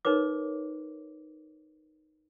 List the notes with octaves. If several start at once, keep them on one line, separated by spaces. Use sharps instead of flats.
D#4 A#4 B4 C#5 D6